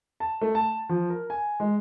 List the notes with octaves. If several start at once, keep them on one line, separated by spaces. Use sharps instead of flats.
A5
A3
A5
F3
A#4
G#5
G#3